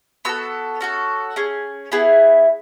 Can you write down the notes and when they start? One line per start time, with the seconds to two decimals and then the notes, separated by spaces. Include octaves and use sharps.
0.25 B3 F#4 A4 E6
0.81 C#4 F#4 A4
1.36 C#4 G#4
1.92 B3 E4 G#4